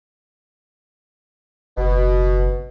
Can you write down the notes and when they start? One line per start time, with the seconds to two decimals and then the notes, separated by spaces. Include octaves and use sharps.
1.77 F#1 B2